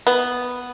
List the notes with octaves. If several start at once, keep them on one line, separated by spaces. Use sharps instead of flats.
B3